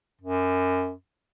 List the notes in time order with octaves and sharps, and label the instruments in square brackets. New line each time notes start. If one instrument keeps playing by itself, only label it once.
[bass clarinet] F#2